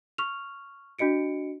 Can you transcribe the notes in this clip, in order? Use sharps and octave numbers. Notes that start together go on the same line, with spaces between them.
C#6 F6 F7
D4 F#4 D#5 C#7 D7